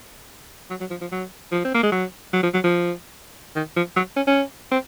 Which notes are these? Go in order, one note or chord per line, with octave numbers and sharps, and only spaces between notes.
F#3
F#3
F3
F3
F#3
F3
C4
A#3
G#3
F#3
F#3
F3
F#3
F3
D#3
F3
F#3
C#4
C#4
C4